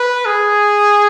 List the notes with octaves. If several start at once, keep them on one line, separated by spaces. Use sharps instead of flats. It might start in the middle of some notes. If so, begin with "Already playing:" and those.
Already playing: B4
G#4